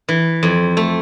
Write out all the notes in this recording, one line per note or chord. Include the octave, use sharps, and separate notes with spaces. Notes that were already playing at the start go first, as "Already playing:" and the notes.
E3
F2
A3